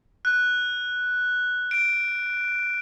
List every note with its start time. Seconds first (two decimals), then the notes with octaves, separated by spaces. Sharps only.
0.25 F#6
1.71 D7